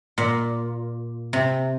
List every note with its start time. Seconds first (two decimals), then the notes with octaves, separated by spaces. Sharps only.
0.18 A#2
1.33 C3